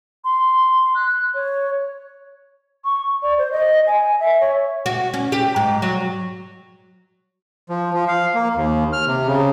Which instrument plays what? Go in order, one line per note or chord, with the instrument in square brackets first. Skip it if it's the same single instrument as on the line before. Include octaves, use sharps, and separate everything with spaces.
[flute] C6
F#6
C#5
[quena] C#6
D5
C5
D#5
G#5
E5
C#5
[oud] F#4
C#4
G4
G#2
F#3
[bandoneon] F3
F3
F5
A#3
D#2
F6
C3
C#3